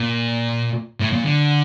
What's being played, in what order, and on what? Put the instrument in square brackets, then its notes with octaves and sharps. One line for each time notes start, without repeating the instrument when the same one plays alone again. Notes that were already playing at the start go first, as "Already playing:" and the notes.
Already playing: [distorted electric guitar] A#2
A2
A#2
D3